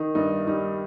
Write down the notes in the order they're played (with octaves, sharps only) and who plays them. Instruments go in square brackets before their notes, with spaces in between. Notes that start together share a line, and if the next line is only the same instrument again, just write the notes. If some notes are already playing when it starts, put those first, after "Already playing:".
Already playing: [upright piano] D#3 D#4
G2 D#4
G3 D#4